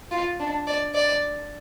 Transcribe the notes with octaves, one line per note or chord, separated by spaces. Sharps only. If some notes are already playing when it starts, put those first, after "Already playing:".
F4
D4
D5
D5